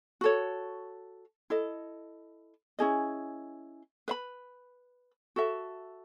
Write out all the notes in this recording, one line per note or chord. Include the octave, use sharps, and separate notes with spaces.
F#4 A4 C#5
E4 A4 D#5
C#4 E4 G#4 D#5
B4 E5 B5
F#4 A4 E5